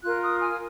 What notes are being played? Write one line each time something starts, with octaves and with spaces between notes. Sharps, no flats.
F4 A#4 F#6
D#6
G#5